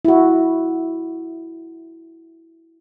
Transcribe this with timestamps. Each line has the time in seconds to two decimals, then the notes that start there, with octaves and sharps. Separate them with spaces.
0.05 E4 F#4